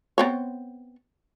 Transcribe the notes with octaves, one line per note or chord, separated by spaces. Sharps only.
B3 C4 C#5